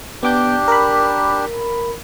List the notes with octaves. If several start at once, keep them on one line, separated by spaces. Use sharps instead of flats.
B3 D4 G4 D6 G6
A#4 B5